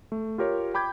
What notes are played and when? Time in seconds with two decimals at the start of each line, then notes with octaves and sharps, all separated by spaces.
0.12 A3
0.38 F4 G4 A#4 C#5
0.74 G5 B5 D6 G6 G#6